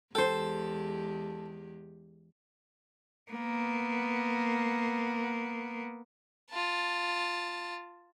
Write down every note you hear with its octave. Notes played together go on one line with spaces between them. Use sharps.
E2 G#3 G4 A4 C5 G5
A#3 B3
F4 A5